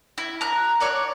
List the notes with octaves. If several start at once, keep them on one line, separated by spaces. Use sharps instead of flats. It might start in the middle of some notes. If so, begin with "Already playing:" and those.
E4
A#5 F#6
C#5 D5 F#5